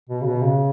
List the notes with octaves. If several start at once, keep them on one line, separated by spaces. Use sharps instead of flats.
B2
C#3
B2
C#3